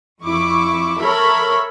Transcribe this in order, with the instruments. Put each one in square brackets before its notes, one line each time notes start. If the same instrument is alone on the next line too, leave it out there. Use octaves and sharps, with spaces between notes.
[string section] F2 E4 C#6 D6
A4 A#4 C#5 E5 B5